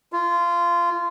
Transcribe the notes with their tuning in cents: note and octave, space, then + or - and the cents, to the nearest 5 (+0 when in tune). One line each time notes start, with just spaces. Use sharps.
F4 -20